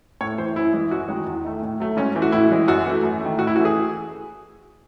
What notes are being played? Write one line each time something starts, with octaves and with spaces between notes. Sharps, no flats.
A2 C#5
E3 A3 C5
F#2 E4
E3 G#3
F#2 F#4
D#3 G#3
E2
D#3 A3
A2
F#3 A3
G#2 C#4
E3 A3
F#4
A2 E4
E3 G#3
F#2 F#4
E3 A3
F#2
D#3 A3
A2 F#4
E4
E3 A3 F#4
G#4